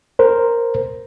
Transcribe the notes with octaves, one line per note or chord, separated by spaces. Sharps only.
A#4 C5